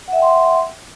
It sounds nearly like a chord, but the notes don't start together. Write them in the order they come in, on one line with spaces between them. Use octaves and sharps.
F#5 E5 G5 C6